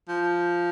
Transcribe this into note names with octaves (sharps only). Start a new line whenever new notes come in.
F3